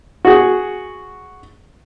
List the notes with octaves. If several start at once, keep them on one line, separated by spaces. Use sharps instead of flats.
F#4 G#4